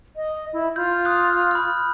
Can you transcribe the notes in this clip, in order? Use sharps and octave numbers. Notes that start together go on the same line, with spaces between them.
D#5
E4
F4 G6
D#6 F#6
B5 F6